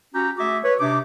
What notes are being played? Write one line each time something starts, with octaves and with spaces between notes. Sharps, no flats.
C#4 F#4 G4 G5 A#5
A3 F#4 G#4 E5 D6
B4 C#5
C3 D4 D#4 D6